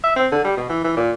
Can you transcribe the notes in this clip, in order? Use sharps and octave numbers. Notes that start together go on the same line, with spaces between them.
E5
C4
D3
G3
B2
E3
E3
A#2